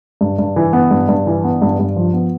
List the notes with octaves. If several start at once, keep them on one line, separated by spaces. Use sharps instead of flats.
G2
G2
E3
B3
G2
G2
E3
B3
G2
G2
F3
B3